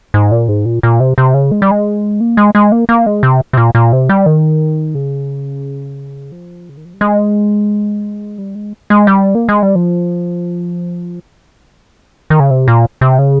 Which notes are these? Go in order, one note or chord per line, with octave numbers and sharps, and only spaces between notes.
G#2
A#2
G#2
A#2
A#2
C3
C3
C#3
G#3
G3
G#3
A#3
G#3
G#3
A#3
A#3
G#3
C3
C3
A#2
A#2
C3
G3
D#3
C#3
F3
C#3
D#3
F3
G3
G#3
G3
G#3
G#3
G3
A#3
G#3
G3
F3
D#3
C#3
C3
A#2
C3
C#3